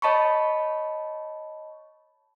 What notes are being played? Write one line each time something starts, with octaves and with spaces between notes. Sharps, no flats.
C#5 D#5 A5 B5 C#6